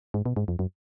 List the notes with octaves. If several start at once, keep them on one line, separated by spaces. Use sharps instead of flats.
G#2
B2
G#2
F2
F#2